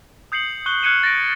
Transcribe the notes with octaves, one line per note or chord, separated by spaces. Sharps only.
D#6 G6 C7 C#7 F#7
C#6 F#6 G7
F6 F#6 G#6 C#7 D#7 E7
A6 A#6 D7